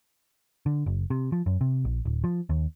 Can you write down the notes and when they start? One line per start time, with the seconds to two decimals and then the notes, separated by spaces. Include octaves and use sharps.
0.66 D3
0.86 F#1
1.10 C3
1.32 F3
1.46 F#2
1.61 C3
1.85 A#1
2.05 D1
2.24 F3
2.49 D#2